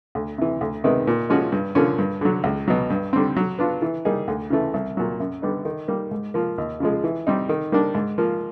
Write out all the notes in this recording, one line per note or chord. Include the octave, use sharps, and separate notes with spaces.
D2
C3 E3
D2
C3 D#3 G#3 B3
A#2
F3 G#3 C#4 F#4
G2
D3 F3 A#3 C#4
G2
D3 F#3
C#2
B2 F#3
G2
D3 G3 C4
F#3
B3 D4 F4
E3
G3 A#3 D#4 G#4
D2
C#3 E3 A3
C2
A#2 F#3
F#2
D3 G3 B3 D#4
D#3
G3 A#3
G#2
F3 A#3
D#2
C#3 F3 G#3
E3
G3 C4 D#4
D#3
G3 A#3 D4
G#2
F3 A#3